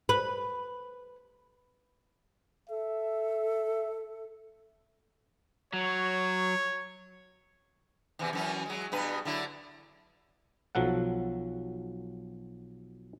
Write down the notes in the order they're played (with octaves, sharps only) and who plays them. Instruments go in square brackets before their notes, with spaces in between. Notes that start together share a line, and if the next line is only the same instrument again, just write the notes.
[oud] B4
[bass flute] A4 [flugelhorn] E5
[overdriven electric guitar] F#3 [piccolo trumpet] C#5
[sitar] E2 C3 E3
F#2 E3 C#4
F#3 G#3
G2 B2 B4
D3 F#3 E4
[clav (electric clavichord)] B1 F3 F#3 A4 F#5